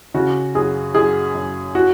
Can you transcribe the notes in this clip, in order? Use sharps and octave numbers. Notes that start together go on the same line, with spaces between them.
C#3 F#4
F#2 G#4
F#2 G#4
F#2
F#4